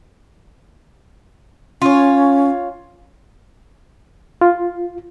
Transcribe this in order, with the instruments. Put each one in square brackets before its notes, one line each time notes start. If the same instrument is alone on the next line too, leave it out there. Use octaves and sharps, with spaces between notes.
[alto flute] C#4 [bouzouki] F4 C#5
[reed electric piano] F4